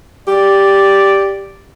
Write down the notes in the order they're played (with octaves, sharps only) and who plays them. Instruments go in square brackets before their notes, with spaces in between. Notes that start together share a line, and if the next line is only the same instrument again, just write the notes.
[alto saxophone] G4 [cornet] D5